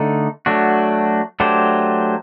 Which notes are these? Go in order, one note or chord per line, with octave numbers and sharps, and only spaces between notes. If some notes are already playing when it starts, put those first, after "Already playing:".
Already playing: D3 A3 D#4
F#3 A3 D4 F#4
F#3 A3 D4 G4 C5